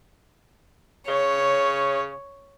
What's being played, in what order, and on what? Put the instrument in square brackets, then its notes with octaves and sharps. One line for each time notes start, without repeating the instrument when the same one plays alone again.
[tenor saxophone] C#3 [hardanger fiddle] C#5